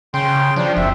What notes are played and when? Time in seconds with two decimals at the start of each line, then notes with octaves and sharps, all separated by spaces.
0.14 C#3 G5 C6
0.56 F3 D4
0.77 F#1 C4 E5